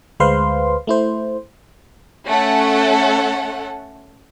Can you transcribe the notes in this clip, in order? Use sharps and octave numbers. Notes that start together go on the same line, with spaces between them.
D2 G#3 B4 C5 F5 C6
A3 E4 C5
A3 C#4 A4 F#5